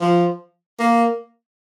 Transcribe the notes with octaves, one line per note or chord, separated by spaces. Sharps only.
F3
A#3